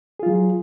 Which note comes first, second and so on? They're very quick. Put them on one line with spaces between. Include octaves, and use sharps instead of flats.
G#4 F4 F#3